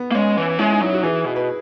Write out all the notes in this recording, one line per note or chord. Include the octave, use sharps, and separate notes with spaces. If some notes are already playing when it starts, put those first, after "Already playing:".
Already playing: B3
A#3
G#3 C#4
E3
G#3 C#4 E4
D#4
F#3 E4
F#4
E3 E4 G#4
B2
B4